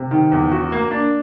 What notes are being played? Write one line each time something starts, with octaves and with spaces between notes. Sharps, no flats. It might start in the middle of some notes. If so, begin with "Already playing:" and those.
Already playing: C3
D#3
E2
F#4
A#3
D4